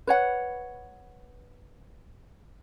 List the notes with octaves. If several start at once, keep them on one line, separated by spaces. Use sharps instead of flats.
B4 C#5 F#5